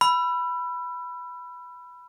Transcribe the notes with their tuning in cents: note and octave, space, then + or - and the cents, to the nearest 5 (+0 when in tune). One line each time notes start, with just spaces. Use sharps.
B5 +0 E6 +35